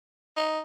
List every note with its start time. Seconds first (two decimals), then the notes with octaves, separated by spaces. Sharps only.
0.37 D#4